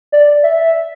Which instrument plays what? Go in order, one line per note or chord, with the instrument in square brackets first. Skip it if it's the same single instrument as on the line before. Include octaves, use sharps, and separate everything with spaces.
[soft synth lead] D5
E5